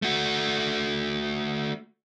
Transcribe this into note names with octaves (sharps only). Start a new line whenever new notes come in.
A3 F#4